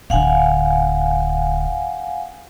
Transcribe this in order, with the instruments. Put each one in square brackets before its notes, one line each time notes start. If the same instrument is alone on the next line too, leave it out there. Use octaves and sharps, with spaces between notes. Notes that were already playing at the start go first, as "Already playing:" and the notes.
[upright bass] D1 D3 [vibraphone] F5 F#5 G#5